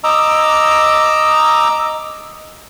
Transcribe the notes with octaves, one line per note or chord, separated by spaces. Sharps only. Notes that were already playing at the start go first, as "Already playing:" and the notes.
D#5 A#5 D6 E6